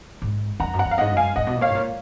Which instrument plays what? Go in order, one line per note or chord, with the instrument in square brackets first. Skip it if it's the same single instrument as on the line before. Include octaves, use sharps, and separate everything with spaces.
[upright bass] G#2
[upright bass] F2 [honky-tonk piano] F#5 A#5
[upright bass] F#2
[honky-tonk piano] F#5 A#5
[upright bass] F2
[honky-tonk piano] F5
[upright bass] G#2 [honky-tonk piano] D#5 F#5
[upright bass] F#2
[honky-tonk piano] F5 G#5
[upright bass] G#2 [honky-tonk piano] D#5 F#5
[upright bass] B2
A#2
[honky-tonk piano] C#5 F5
[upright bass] G#2
A#2